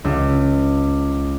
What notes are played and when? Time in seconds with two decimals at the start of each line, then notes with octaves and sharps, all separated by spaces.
0.04 C#2